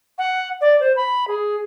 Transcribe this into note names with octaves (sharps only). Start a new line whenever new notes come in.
F#5
D5
C5
B5
G#4